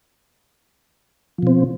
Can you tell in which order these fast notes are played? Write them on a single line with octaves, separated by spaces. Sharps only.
F3 B2 C4